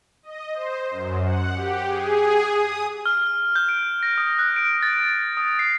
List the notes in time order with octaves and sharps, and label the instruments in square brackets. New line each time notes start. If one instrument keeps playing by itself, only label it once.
[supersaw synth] D#5
C5
F#2
F#5
G4
G#4
D#6
[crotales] F6
G6
D7
A#6
D#6
F#6
D7
A6
D#6
C7